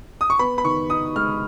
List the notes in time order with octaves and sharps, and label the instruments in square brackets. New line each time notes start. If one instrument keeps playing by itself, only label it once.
[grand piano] D#6
C#6
B3 B5
B5
D#3 C#6
D#4 D#6
G#3 F6